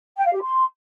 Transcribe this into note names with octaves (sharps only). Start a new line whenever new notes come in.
G5
F5
G4
C6